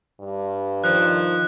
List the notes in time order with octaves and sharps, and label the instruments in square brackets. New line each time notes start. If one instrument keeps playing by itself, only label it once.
[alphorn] G2
[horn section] D#3 F3 [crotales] F#6